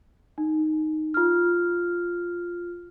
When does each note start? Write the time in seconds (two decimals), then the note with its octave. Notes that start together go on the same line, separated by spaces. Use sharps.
0.38 D#4
1.14 F4 F6